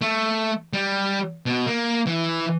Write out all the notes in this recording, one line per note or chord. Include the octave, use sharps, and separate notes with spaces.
A3
G3
B2
A#3
E3